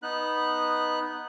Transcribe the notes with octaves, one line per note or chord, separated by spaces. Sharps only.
B3 D#4 F#6